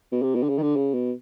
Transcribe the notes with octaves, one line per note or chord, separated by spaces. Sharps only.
B2
C3
B2
D3
C#3
D#3
D3
C#3
B2